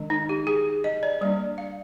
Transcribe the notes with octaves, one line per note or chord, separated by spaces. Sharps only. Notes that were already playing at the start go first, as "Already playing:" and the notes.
Already playing: D#3 G#3 D4
D#4
G4
G#4
D#5
D5
G3 A#3 D4 D5
F5